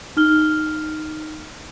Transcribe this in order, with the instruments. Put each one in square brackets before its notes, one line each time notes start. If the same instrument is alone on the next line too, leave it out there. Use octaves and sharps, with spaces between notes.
[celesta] D#4 F6 G7